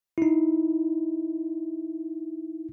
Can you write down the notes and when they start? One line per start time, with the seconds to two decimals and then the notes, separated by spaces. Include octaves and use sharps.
0.18 D#4 E4